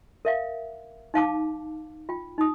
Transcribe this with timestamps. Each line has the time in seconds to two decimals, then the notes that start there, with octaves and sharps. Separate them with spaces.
0.25 A#4 E5 F5
1.14 D#4 F5 A5 D6
2.09 F4 G5
2.38 D#4 D#6